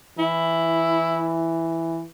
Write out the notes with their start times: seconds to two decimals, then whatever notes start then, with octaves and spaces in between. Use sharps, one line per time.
0.19 E3 E4